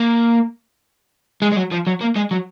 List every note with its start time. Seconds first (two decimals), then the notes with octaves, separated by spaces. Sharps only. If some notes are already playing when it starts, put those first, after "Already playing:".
Already playing: A#3
1.42 G#3
1.52 G#3
1.56 F#3
1.72 F3
1.87 F#3
2.01 A#3
2.16 G#3
2.31 F#3